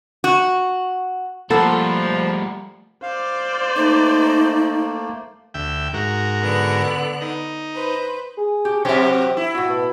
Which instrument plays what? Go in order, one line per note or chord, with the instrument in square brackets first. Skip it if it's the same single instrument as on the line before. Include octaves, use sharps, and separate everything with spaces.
[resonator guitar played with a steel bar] F#4
[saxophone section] F3 [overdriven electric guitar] G3 A3 [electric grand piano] A#3 F#5 B5 [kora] A4 C5
[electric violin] C5 D5 [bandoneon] F5
[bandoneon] A3 A#3 [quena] D#4
[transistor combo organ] D2 E5 G5
G#2 F#4 A#4
[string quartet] D3 B3 F#6
[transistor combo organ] D#4
[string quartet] B4 C5
[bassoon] G#4
[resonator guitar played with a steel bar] G4
[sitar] C3 F#4 G4 [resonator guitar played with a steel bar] F#3 E5 [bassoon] C4
[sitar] E4
[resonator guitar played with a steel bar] A2 F#4
[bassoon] B2